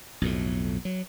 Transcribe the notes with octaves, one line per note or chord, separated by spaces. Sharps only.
B1 F2 A2
F#3